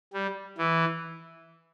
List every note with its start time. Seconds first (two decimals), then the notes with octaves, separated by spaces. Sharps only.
0.13 G3
0.57 E3